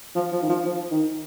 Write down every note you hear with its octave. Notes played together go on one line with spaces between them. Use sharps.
F3
F3
D#3
F3
F3
D#3